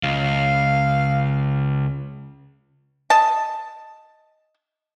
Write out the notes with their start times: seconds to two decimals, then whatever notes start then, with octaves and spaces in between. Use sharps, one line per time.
0.03 C#2 F5
3.10 D#5 A5